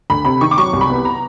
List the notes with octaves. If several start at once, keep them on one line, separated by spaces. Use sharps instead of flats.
D2 B5
C3 B5
D#3 C#6
D6
F#3 C#6
C2
B5
B3
A#5